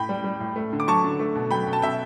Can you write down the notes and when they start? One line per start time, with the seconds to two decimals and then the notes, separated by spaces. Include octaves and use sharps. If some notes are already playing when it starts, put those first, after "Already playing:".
Already playing: A2 G5 B5
0.09 G3
0.24 G3
0.40 A2
0.56 A3
0.73 D3
0.80 D6
0.87 F#3 A5 C#6
1.04 D3
1.19 A3
1.35 B2
1.51 F#3 G5 B5
1.67 B2
1.73 A5
1.82 B2 E5 G5